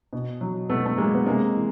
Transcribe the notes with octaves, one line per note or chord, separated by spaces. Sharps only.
B2
F#3
B2 A3 B3
A3
F#3 G#3 A#3
B3
C3 G#3 A#3
E3